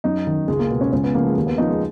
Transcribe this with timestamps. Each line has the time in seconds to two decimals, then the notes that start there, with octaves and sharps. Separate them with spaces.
0.04 F#2 D#4
0.27 D#3
0.48 C#2 G#3
0.59 A#3
0.70 B2 B3
0.81 C#4
0.92 C#2 C#4
1.04 B3
1.14 C#3 F3 A#3
1.25 G#3
1.36 D#2 A#3
1.47 B3
1.58 C#3 F3 D#4
1.69 G#3